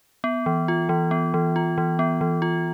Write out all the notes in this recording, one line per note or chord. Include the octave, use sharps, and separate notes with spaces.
B3
E3
F4
E3
B3
E3
F4
E3
B3
E3
F4